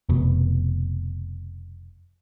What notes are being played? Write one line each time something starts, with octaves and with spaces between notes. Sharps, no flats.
F1 B2